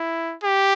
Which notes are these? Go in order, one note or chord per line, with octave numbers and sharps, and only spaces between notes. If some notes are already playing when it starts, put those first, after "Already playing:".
Already playing: E4
G4